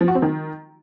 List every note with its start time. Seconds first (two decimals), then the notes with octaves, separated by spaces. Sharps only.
0.01 F3
0.08 F#4
0.15 C4
0.22 D#3